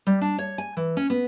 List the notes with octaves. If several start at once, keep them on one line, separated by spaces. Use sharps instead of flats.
G3
D4
C#5
G#5
E3
C#4
B3